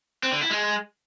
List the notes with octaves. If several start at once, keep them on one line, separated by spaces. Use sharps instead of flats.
C4
D3
E4
G#3